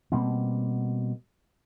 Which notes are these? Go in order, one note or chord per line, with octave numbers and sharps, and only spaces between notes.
B2 G3 A#3 C4